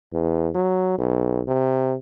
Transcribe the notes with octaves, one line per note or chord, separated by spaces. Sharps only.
E2
F#3
B1
C3